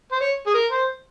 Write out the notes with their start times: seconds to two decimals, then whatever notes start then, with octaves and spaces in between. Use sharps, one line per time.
0.12 C5
0.21 C#5
0.47 G#4
0.54 A#4
0.71 C5